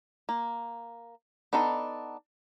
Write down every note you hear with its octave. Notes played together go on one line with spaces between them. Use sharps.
A#3
B3 D4 D#4 A4